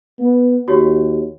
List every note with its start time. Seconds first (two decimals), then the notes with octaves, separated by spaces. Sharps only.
0.18 B3
0.68 D#2 F#4 G4 C#5